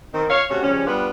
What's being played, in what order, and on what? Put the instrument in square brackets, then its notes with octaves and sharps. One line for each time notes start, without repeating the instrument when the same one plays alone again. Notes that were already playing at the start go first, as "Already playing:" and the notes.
[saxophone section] D#3 C4
C#5 F5
C3 A3 C#4 F#4
C#3 F3 G3 C#4
G3 B3 D4 F4 G4 B4